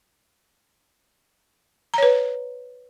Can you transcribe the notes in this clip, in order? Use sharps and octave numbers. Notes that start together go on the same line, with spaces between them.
B4 C#5 A#5